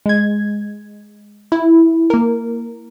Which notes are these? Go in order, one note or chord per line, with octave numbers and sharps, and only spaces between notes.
G#3 G#6
E4
A#3 A#4